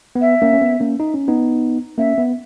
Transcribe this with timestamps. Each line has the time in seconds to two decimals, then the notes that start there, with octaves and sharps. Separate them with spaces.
0.15 B3
0.21 E5
0.42 A#3 C#4
0.53 C#4
0.62 B3
0.80 A#3 C#4
1.00 D#4
1.14 C#4
1.28 B3 D#4
1.98 A#3 C#4 E5
2.18 B3